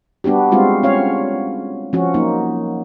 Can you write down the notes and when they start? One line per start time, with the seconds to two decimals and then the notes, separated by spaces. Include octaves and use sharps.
0.24 G3 B3 D4 F#4 G4
0.52 G3 G#3 C4 F4 F#4
0.83 C#4 C#5 F5
1.93 F3 C#4 F#4
2.14 F#3 A#3 D#4